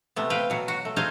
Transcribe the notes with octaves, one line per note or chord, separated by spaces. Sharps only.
C3 A3 B3
B4 F5 G5
B2 F#3
F#4
A3
D#4 F4 G#4 C5 F5